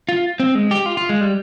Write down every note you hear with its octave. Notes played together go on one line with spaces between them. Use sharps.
F4
C4
G#3
G4
F4
F4
G#3
G3